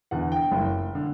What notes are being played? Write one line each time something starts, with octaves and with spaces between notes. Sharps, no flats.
E2 D3 F#5
G5
F#1
D3